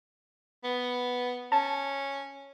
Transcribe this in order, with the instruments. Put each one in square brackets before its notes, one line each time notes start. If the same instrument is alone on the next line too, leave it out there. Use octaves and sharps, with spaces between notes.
[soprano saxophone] B3
[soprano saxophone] C#4 [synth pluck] A5